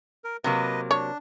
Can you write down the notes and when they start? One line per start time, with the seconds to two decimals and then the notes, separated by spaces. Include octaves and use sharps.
0.24 A#4
0.44 C3 F#3 A#3 B4 D#5
0.91 D4 C#5